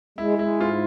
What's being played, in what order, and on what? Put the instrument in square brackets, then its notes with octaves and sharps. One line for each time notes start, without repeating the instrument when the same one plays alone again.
[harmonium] G#3 [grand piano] E4
[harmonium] G#3 [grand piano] E4
[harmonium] G#2 [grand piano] F4